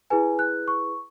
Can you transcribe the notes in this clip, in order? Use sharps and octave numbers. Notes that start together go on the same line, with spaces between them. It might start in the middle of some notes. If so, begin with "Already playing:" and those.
E4 G#4 B4 G#5
F#6
C#6